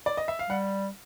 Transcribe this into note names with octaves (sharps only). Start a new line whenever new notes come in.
D5
D#5
E5
F5
G3 F#5